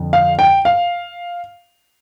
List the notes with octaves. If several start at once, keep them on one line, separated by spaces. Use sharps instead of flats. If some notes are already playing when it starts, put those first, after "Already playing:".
Already playing: F2 D3
F5
G5
F5